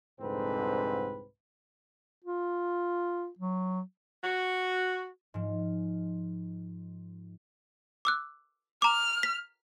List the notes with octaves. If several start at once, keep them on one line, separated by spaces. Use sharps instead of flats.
C2 F2 G#2 D3 C4 B4
F4
F#3
F#4
G#2 F3
D6 E6 F#6
A#5 D6 F6
B6